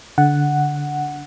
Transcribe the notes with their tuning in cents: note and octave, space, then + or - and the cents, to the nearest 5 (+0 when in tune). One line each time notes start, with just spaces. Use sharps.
D3 -15 F#5 +0